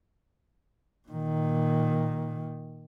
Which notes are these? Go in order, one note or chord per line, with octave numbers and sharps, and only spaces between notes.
A#2 D#3